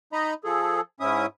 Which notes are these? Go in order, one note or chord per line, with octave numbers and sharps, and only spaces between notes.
D#4 D#5 A#5 B5
F3 G#4 A4
G#2 C#4 E4 E5 D#6